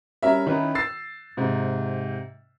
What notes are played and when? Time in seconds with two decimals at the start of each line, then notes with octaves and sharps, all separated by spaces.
0.23 G3 C#4 A#4 E5
0.46 D#3 C#4 D#4 E4 B4
0.75 E6 A6 C7
1.37 G#2 C3